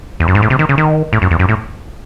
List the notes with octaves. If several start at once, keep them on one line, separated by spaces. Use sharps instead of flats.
E2
F#2
G#2
A2
C3
D#3
C#3
D#3
A2
F#2
E2
F#2
A2